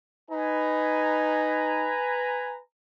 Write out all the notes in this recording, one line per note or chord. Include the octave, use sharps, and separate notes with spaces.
D#4 B4 G#5 A#5